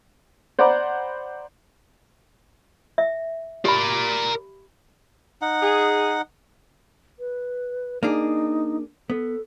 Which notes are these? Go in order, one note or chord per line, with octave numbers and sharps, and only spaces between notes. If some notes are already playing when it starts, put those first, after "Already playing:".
C5 D5 F#5 A#5 B5 D6
E5
G4 A#4 D5 B5
D#4 F#5
G#4
B4
A#3 D4 D#4 G#4
B3 A4